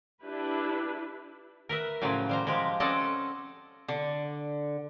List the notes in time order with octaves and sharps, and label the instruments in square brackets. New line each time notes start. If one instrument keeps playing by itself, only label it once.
[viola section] D4 E4 G4 B4
[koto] A#4 B4 E5
A2 C#3 F3 F#3
G3 C5 A#5
F3 G#3 G4
C4 C#4 A4 D5 D#5 F#5
[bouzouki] D3